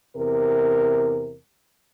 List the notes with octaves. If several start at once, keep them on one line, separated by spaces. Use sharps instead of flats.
E2 C3 A#4